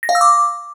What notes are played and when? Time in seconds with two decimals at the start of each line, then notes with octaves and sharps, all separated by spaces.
0.03 A#6
0.09 F5
0.15 E6
0.21 D6